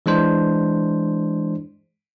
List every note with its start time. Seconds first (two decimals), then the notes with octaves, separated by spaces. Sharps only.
0.06 E3 G#3 D4 C5